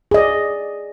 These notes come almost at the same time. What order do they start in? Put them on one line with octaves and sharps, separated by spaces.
G#4 D#5 D5